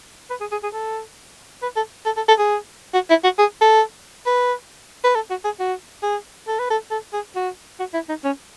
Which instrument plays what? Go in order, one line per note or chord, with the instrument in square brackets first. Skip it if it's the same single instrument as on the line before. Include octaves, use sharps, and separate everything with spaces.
[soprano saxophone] B4
G#4
G#4
G#4
A4
B4
A4
A4
A4
A4
G#4
F#4
E4
F#4
G#4
A4
B4
B4
A4
F#4
G#4
F#4
G#4
A4
B4
A4
A4
G#4
F#4
F#4
E4
D#4
C#4